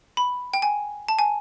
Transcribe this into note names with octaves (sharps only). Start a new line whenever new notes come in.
B5
G5
G#5
A5
G#5